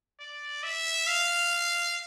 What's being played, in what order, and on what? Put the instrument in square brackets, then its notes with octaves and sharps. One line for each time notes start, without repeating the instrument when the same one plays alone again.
[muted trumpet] D5
E5
F5